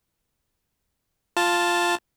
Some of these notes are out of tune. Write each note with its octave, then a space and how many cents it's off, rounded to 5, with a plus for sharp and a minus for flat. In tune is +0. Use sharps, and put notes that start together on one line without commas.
F4 +0 A5 +0